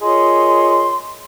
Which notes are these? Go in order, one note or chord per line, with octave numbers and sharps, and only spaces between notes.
F4 G#4 A#4 C#5 D#5 C6